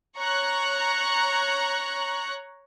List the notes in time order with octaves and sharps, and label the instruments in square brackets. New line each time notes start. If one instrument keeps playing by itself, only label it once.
[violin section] C#5 A#5 C#6 F#6